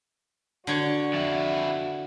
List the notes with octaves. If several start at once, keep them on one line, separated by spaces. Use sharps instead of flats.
D3 F#4 C#5
F2 E4